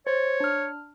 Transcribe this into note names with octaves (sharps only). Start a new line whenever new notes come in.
C5 C#5 A6
D4 F6